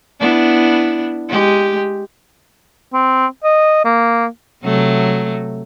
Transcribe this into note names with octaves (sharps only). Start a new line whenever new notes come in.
B3 D4 E4
G#3 G4
C4
D#5
A#3
C3 F#3 A3